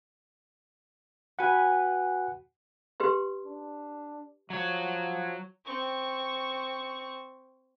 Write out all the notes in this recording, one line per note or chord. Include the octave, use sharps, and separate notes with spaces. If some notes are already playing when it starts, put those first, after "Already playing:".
F#4 B4 F#5 G#5
G4 B4 C6
D4
F3 F#3 C#5
C4 C#6